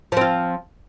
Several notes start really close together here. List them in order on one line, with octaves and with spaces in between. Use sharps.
F3 C4 F4